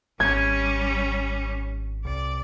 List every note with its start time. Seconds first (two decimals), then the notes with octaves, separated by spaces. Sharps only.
0.20 G#1 G3 C#4 G#6
2.05 C2 D5